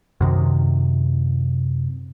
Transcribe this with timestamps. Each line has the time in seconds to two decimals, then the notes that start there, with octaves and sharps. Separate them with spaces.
0.21 F#2 C3 D#3